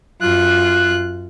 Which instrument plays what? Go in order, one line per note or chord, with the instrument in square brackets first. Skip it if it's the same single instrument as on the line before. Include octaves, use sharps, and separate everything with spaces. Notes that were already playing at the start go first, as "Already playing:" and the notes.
[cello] F#2 F4 [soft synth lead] F#6